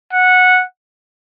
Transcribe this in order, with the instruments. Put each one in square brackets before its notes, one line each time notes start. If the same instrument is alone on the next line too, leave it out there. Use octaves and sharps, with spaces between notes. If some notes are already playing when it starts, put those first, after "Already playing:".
[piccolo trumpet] F#5